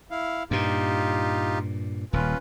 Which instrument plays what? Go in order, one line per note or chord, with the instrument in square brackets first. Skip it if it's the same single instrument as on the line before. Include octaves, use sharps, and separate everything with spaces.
[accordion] E4 F5
[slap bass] G2 A#2 [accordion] D#4 F4 G4
[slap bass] D#1 [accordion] C#4 F4 B4